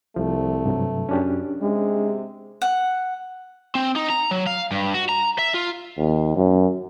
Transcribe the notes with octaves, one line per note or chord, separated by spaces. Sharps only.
C2 F3 A3
G2 C3 F#3
F#2 C#4 D4 G4
C3 G#3
F#5
C4
D#4
A#5
F#3
F5
G2
F#4
A#5
E5
F4
D#2
F#2